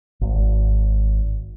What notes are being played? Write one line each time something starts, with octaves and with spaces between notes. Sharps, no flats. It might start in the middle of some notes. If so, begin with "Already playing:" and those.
G#1